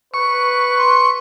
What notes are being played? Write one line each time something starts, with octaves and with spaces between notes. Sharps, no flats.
B4 C#6
C6